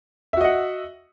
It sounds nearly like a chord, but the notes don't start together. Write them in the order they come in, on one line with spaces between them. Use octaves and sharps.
E5 F#4 D#5 F#5